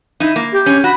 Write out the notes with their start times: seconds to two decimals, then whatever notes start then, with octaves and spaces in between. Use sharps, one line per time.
0.20 D#4 E4
0.36 A#3
0.52 G4
0.66 C#4
0.84 F#4 B5